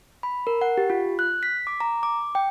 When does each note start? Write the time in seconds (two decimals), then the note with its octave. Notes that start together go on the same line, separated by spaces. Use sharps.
0.23 B5
0.47 A#4
0.61 F#5
0.77 G4
0.90 F4
1.19 F#6
1.43 B6
1.67 D6
1.80 A#5
2.03 D6
2.35 G5